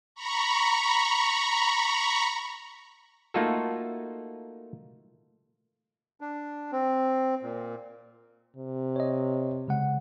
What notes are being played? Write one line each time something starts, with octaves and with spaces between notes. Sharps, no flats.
A#5 B5 C#6
A3 A#3 D#4 F4 F#4 A4
D4
C4
A#2
C3
C#5 D#5
C#3 G#3 F#5